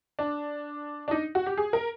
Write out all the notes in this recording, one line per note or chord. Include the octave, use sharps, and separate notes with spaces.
D4
D4
D#4
F#4
G4
G#4
A#4